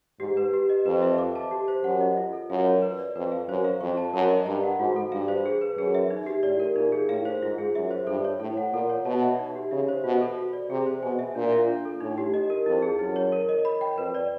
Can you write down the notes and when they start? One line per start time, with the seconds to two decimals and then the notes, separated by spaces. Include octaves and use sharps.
0.20 G#2 G4
0.37 B4
0.54 G4
0.69 D#5
0.86 F2 B4
1.02 E5
1.18 D6
1.35 A5
1.51 G4
1.68 C5
1.84 F#2 F#5
2.01 D#5
2.17 F4
2.33 A4
2.50 F#2 F5
2.66 C#5
2.82 B4
2.99 D5
3.16 F2 B4
3.32 F5
3.49 F#2 C5
3.64 F5
3.81 F2 C#6
3.97 A5
4.13 F#2 A#4
4.30 D#5
4.46 G2 A#5
4.64 F#5
4.79 G#2 F#4
4.96 A4
5.12 G2 F5
5.28 C5
5.46 G#4
5.61 B4
5.78 F#2 G#4
5.95 E5
6.11 D#4
6.26 G4
6.43 A2 D5
6.60 A#4
6.76 A#2 D#4
6.92 G#4
7.09 A2 F5
7.25 C5
7.42 G#2 F4
7.58 G#4
7.75 F#2 E5
7.91 C5
8.07 G2 A4
8.24 C#5
8.40 A2 A4
8.57 F#5
8.72 A#2 A4
8.90 C#5
9.05 B2 A5
9.22 E5
9.39 D#4
9.55 G4
9.71 C#3 E5
9.88 C5
10.04 B2 F#4
10.21 A4
10.37 F#4
10.53 D5
10.70 C3 G#4
10.86 C5
11.03 B2 G#5
11.19 E5
11.35 A#2 D4
11.52 F4
11.68 D4
11.85 A4
12.01 A2 D#4
12.18 G4
12.34 D#5
12.50 A#4
12.66 F2 E4
12.82 G#4
12.99 F#2 E4
13.16 C#5
13.32 A#4
13.49 D#5
13.65 B5
13.81 G5
13.98 F2 B4
14.15 D5